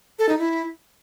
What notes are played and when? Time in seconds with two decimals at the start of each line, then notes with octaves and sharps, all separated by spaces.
0.19 A4
0.29 D#4
0.39 E4